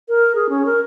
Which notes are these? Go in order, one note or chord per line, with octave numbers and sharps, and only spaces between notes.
A#4
G#4
C#4
A#4